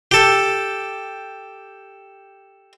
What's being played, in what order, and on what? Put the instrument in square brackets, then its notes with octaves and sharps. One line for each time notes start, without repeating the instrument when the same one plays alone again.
[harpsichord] G4 A4